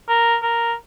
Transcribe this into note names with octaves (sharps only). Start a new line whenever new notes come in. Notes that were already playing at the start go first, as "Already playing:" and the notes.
A#4
A#4